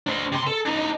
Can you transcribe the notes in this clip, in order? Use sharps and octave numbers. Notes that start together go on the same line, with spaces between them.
D4 C5
C3 C6
A4
D4 D#4